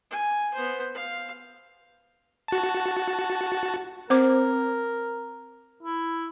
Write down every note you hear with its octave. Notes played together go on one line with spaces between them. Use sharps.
G#5
B3 C5
F5
F#4 A5
C4 A#4 C5 D6
E4